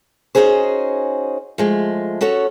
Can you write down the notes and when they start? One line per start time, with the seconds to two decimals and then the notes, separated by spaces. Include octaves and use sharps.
0.35 C#4 D#4 F#4 G#4 C5
1.58 F3 G#3 A3
2.21 C#4 F#4 A4 C#5